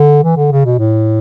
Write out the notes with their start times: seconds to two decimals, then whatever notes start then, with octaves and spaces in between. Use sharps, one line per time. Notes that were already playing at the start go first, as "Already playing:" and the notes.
Already playing: D3
0.23 E3
0.37 D3
0.52 C#3
0.65 B2
0.79 A2